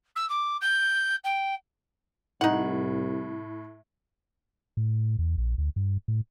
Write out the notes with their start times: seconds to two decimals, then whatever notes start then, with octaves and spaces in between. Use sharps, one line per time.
0.15 E6
0.29 D6
0.61 G6
1.24 G5
2.41 C2 A2 D#4 F#5
4.77 A2
5.19 E2
5.38 A#1
5.58 D2
5.76 G2
6.08 A2